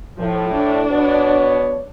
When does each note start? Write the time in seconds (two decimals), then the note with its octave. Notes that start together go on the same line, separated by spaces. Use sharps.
0.18 A2 F3
0.53 D4
0.90 B2 B3 C#5